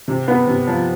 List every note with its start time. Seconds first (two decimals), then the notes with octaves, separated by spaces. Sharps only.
0.08 C3
0.28 B3
0.47 C3
0.67 F3